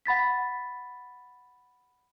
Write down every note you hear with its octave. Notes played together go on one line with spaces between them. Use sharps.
F#5 B5 A6 B6